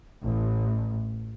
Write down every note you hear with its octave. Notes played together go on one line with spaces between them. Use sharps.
A1